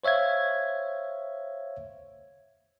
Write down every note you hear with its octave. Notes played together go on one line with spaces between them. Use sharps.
C5 C#5 E5 F5 G#6